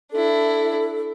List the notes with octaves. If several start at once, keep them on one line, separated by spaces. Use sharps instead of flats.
D4 E4 A4